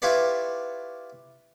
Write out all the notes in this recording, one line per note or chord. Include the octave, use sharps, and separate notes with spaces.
E4 F4 G4 B4 C#5 D5